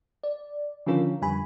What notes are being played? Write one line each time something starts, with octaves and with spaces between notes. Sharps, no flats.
D5
D3 D#3 F3 C#4 F4 A#4
F2 D3 G3 G#5 B5